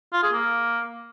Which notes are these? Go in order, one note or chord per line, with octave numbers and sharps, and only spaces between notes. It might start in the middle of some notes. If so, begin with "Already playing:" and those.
F4
G#4
A#3